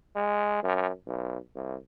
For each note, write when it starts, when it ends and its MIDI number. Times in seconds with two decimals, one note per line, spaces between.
0.16 0.61 56
0.63 0.90 42
1.07 1.37 35
1.55 1.76 36